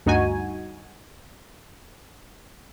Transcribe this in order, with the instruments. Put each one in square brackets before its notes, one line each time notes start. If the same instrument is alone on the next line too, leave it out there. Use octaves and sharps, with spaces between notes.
[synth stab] D2 G2 D#4 F#4 G#5